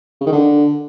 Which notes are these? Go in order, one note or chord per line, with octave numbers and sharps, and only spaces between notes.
C#3
D#3
D3